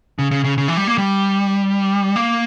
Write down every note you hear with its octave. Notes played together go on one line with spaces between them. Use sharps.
C#3
C#3
C#3
C#3
E3
G3
A#3
G3
A#3